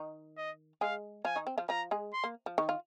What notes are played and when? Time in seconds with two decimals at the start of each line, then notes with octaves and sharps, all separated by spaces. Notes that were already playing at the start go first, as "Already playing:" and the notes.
Already playing: D#3 D#4
0.37 D#5
0.81 G#3 G#4 F5
1.25 F3 F4 G#5
1.36 D#3 D#4
1.47 C4
1.58 F3 F4
1.69 F3 F4 A#5
1.91 G#3 G#4
2.13 C6
2.24 A#3
2.46 F3
2.58 D#3
2.69 F4